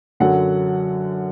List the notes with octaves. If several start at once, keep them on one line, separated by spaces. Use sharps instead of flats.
F#2 D3 F#3 F#5